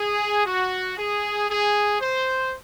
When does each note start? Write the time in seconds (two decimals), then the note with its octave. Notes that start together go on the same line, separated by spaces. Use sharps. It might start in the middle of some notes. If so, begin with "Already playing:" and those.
Already playing: G#4
0.46 F#4
0.97 G#4
1.49 G#4
2.00 C5